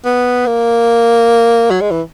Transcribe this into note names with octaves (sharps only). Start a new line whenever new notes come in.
B3
A#3
F#3
G#3
E3